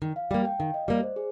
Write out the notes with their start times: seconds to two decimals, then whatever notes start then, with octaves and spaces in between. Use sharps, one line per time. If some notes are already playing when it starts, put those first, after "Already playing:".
0.02 D#3
0.16 F5
0.31 G3 A#3 G5
0.45 G5
0.59 D#3 F5
0.74 D#5
0.88 G3 A#3 D5
1.03 C5
1.16 G#4